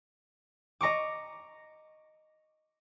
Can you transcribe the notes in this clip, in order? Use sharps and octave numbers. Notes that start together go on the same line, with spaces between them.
D#5 A#5 C#6 D6